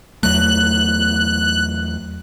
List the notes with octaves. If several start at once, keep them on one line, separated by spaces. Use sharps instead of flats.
E2 F#3 A3 F#6